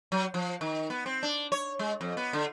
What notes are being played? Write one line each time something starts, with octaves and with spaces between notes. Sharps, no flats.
F#3
F3
D#3
B3
C4
D4
C#5
G#3
F2
B3
D3